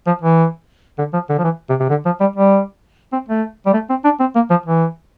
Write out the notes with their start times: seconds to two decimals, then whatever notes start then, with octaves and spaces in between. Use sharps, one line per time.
0.07 F3
0.22 E3
0.98 D3
1.13 F3
1.29 D3
1.39 F3
1.44 E3
1.70 C3
1.80 C3
1.90 D3
2.06 F3
2.21 G3
2.36 G3
3.12 C4
3.29 A3
3.66 G3
3.74 A3
3.90 C4
4.04 D4
4.20 C4
4.35 A#3
4.50 F3
4.66 E3